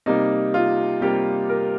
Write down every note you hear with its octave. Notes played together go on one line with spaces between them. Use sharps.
C3 G3 A#3 D#4
F4
C3 G3 A#3 G4
A#4